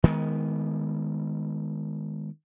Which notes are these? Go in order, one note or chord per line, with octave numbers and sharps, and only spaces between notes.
D#3 G#3 B3